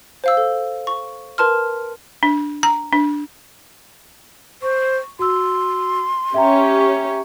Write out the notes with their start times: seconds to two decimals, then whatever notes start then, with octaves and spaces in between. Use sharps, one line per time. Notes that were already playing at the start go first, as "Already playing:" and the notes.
0.24 C5 F5 E6
0.37 A4
0.87 C#6
1.38 A#4 B4 A5 C6 F6
2.23 D4
2.63 A#5
2.93 D4
4.62 C5 C#6
5.19 F#4 C6 E6
6.34 C#4 G4 C#5 E5 G5 A#5